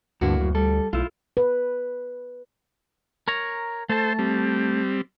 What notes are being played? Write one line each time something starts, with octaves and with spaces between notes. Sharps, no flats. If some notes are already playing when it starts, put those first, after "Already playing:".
D2 G2 D3 A#3 E4 F#4
F#2
G3 A4
B1 A3 E4 F4
B4
A#4 C#5 A#5
A3 A4 C5 A5
G3 C4